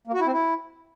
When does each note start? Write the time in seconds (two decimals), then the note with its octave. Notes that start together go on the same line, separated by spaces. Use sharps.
0.07 A#3
0.14 F#4
0.20 E4
0.26 C4
0.33 E4